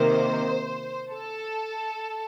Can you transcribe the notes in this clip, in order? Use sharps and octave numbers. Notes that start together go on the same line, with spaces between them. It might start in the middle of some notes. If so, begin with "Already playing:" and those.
Already playing: C3 D#3 A#3 C5
A4